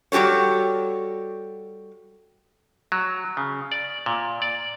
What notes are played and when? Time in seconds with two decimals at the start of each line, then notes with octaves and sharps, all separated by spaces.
0.12 G3 F#4 G4 A4 C#5
2.92 F#3
3.37 C#3
3.72 D5
4.06 A#2
4.42 D5